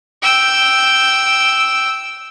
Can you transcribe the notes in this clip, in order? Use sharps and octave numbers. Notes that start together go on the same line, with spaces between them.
G5 E6